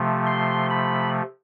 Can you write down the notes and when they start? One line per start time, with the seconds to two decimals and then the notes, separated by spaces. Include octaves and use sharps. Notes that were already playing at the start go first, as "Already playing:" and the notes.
Already playing: C3 F3 A3
0.27 C6
0.70 B5